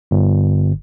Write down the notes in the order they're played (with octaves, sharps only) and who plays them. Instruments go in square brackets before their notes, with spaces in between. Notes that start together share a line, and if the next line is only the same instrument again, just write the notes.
[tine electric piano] G1